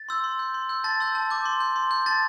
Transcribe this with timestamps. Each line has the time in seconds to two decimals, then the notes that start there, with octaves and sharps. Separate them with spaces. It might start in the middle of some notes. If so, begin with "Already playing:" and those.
Already playing: A6
0.09 C6 E6 G6
0.24 C6
0.39 G6
0.54 C6
0.69 E6 G6
0.84 A5 A6
1.00 C6 E6 G6
1.15 A5
1.30 D6 G6
1.45 C6
1.60 G6
1.76 C6
1.91 G6
2.06 A5 A6